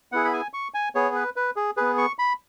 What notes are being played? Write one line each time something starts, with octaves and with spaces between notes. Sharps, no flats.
B3 E4 G#4 F#5
B5
G#5
C#6
G#5
B3 G#4 C#5
B4
B4
G#4
B3 G#4 B4
C#6
B5